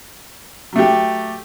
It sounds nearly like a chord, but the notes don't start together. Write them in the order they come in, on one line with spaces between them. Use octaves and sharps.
F#3 A3 G4